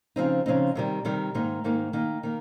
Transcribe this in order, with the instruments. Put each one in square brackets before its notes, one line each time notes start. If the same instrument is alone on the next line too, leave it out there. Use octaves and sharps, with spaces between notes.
[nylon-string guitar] C#3 F3 C4 D#4
C#3 F3 C4 D#4
C3 D#3 G3
C3 D#3 G3
G#2 D#3 A#3 D#4
G#2 D#3 A#3 D#4
D#3 A#3 D#4
D#3 A#3